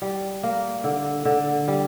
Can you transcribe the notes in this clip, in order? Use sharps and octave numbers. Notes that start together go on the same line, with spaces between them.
G3
A#3
D3
D3
G3